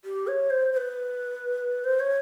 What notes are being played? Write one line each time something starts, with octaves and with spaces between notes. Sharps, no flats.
G4
C#5
C5
C5
B4
C5
C#5